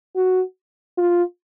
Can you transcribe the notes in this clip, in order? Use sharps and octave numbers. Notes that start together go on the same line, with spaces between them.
F#4
F4